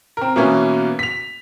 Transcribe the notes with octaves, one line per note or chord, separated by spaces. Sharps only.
C4 A#4
B2 E3 A#3 B3 C#4
B6 F7